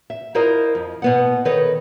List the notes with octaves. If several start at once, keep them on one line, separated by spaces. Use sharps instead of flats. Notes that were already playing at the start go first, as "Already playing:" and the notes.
E5
E4 F4 A#4 C5 D#5
F2
B2 B3 F#5
D#3 A4 B4 C#5 D#5